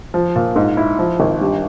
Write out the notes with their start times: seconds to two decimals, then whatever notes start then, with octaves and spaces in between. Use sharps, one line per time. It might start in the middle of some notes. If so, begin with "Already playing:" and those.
0.14 F3
0.36 A#2
0.56 G#2
0.77 E4
0.99 F3
1.20 G#1
1.41 G2